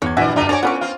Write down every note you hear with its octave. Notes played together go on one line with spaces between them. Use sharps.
E2 C#5 G#6
A#1 D#3 G3 F#4 E5 G#5
G1 D4 F4 G4 D5 E5 A#5 D#7
C4 D4 F#4 C#5 G#5 A5 D6 F7
A2 B3 C#4 F4 B5 C#6 D6
C4 F4 F5